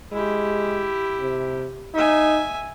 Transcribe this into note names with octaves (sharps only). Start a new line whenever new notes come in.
G#3 E4 G4
C3
D#4 E5 G#5